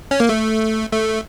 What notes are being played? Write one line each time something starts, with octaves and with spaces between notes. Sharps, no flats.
C#4
A#3
A3
A3